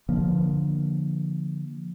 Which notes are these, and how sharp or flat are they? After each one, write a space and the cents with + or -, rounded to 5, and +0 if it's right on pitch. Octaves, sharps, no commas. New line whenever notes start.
D3 +0 F3 +0 A#3 +15